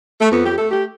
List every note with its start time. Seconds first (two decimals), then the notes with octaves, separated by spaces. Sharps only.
0.20 A3
0.30 F2 B3
0.44 G4
0.57 A3 A4
0.71 G4